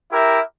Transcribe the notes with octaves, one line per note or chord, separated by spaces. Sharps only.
E4 G4 A#4 E5